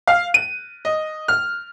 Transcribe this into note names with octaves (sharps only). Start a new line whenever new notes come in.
F5
D#7
D#5
F6